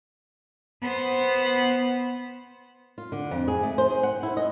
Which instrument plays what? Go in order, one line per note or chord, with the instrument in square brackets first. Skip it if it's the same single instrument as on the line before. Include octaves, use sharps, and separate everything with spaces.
[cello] B3 C5
[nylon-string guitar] F4
D3
F2
G#4
A3
C5
G#4
F#5
E4
D#5